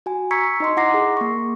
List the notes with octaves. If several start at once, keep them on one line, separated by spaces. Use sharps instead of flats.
F#4 G#5
A#5 C#6 E6 G#6 B6 C#7
D#4 D#5 C6
E4 F#5 A#5 D6 A#6 C7
G#4
A#3 C#6